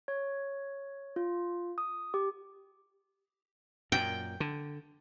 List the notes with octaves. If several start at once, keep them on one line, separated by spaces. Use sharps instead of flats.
C#5
F4
D#6
G4
F#2 A#2 G5
D3